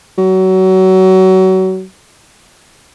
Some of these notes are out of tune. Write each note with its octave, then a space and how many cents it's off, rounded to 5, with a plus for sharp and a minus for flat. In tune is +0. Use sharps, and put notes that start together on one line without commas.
F#3 +25